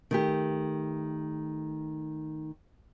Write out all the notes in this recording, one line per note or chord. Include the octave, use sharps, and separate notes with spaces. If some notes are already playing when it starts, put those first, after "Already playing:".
D#3 A3 G4